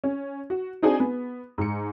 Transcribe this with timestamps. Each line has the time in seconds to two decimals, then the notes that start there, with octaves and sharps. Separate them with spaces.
0.04 C#4
0.50 F#4
0.82 C4 D4 D#4 F#4 G#4 G#5
1.00 B3
1.58 G#2 C#7